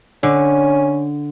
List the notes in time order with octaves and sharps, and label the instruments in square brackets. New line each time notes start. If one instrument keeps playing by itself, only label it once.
[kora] D3 [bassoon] C#4